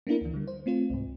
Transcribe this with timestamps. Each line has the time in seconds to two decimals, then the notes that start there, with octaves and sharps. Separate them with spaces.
0.07 A#3 B3 D4 E4 A#4
0.21 D2 E3
0.34 D3 G3
0.48 C5
0.66 A3 C4 F4 C5
0.90 C2 G#2